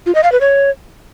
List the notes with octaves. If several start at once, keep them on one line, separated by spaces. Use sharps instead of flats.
F4
D#5
F5
B4
C#5